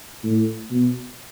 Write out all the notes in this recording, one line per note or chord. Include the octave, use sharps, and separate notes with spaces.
A2
B2